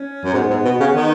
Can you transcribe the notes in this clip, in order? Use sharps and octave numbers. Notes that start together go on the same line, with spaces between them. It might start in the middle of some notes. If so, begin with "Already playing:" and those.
Already playing: C#4
F#2
G#2 B3
G#2
B2
C#3
D#3